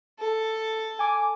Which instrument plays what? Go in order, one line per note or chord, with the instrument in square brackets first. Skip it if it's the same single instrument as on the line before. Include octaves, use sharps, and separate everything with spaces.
[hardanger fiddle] A4
[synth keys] G#5 D6